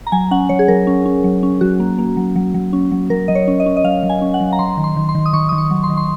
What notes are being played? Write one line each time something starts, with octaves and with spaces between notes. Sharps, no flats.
A#5
F#3 G#5
C#4 F#5
F#3 C#5
G#4
F#3 A#4
C#4
C#4
F#3
C#4
F#3 F#4
A#3
A#3
F#3
F#3
F#3
C#4
F#3
F#3 A#4
F#3 D#5
C#5
C#4
D#5
C#4
D#5
F#3 F5
F#3
G#5
C#4
F#5
F#3
A#5
F#3 C6
D#3
C6
D#3
C6
D#3
D#6
D#3 C#6
D#3 D#6
C#6
F#3
C6
D#3
C6